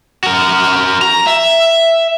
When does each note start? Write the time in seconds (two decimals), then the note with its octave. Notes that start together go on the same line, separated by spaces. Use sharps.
0.24 F#4 A#4
1.02 A#5
1.27 E5